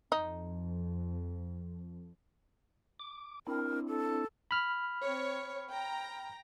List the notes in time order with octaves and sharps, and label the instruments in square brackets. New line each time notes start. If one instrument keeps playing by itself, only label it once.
[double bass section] F2 [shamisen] D#4
[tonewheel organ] D6
[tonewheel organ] C4 D4 E4 [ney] A#4
[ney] A4
[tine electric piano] B5 F6
[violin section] C4 C#5
G5 A#5